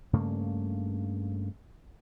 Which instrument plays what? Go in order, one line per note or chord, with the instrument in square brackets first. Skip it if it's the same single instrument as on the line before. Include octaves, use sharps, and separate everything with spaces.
[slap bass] G2 C#3 A3 A#3